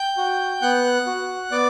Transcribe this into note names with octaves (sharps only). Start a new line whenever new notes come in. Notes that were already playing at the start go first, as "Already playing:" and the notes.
Already playing: G5 G6
F#4
B3 F#5 F#6
F#4
B3 D5 D6